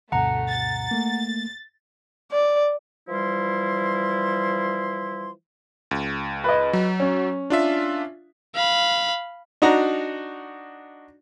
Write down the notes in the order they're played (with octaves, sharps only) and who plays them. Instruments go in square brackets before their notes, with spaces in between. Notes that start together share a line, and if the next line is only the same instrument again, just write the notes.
[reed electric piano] D2 G2 B2 [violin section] A3 [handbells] F#5 A#5
[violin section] A6
[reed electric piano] A3 A#3
[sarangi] D5
[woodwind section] E3 F3 G3 E4 C6
[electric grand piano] C#2
[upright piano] B4 D#5
[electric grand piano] F#3
[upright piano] C#4
[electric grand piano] D4 F4 E5
[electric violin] F5 B5
[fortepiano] D4 D#4 F#4 A#5